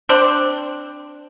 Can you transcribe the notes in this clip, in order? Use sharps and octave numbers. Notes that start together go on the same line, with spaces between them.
C4 D4